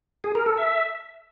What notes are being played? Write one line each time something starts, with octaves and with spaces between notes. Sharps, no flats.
G#4
A#4
A4
E5